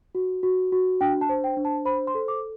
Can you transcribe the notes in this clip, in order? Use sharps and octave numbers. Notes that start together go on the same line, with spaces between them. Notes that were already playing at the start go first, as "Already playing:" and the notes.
F#4
F#4
F#4
D4 G5
A5
C5
G5
D4
A5
C5 B5
C6
A4
D6